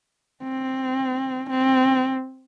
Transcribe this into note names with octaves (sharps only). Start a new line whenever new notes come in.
C4
C4